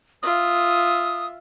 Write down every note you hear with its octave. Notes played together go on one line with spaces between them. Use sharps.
F4 E5 D#6